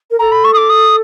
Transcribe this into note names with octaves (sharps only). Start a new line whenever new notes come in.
A#4
A4 A#5
B5
C#6
D#6
D6
D#6